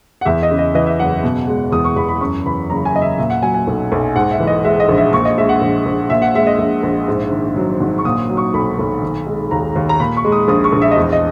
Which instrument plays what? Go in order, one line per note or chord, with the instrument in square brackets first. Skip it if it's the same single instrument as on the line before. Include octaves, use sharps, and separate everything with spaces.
[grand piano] F#5
E2 E5
D#5
C#3
D#5
E3 D#5
E5
F#1 F#5
B2
G#3
E2 D#6
C#6
E2 B5
B5
F#2 C#6
E3 B5
F#1 A#5
G#5
F#1 D#5
E5
A#2 E5
F#5
F#3 G#5
G#5
B1
B1
G#2 F#5
E5
E3
D#5
G#3 E5
D#5
A#1
E5
A#2 C#6
D#5
G#3 E5
F#5
A#1
A#1
A#2 E5
F#5
G#3 E5
D#5
A#1 E5
A#1
G#2
D#3
F#3
G#1
C#6
A#2 D#6
F#3
C#6
B1 B5
B1
D#3
G#3
D#2 A#5
D#2
A#5
A#2 B5
C#6
G#3
D#6
A#1 D#6
C#6
A#1
E5
D#5
E2
D#5